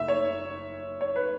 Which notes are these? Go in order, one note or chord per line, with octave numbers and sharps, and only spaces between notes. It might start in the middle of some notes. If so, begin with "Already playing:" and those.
Already playing: F#1 F#2 A3 E5
C#5
C#5
B4